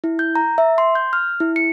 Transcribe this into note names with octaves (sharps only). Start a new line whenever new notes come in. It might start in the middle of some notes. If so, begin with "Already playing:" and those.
E4
G6
A#5
E5
C6
G6
F6
E4
C#7